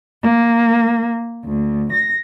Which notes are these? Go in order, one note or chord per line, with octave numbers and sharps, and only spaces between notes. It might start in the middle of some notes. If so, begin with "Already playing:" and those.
A#3
D2
A#6